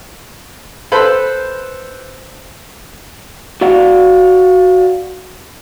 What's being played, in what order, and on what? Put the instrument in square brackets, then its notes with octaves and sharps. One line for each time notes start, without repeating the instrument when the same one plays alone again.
[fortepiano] A4 B4 C5 B5
[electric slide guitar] F#4 D5 F5 F#5